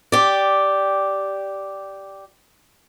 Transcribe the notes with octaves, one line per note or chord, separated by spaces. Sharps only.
G4 D5